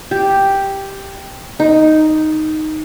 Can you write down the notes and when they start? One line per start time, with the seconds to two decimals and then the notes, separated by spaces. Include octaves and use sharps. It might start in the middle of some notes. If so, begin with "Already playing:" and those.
0.11 G4
1.60 D#4